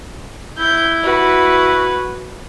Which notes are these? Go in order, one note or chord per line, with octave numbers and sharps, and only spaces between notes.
E4 G6
F#4 B4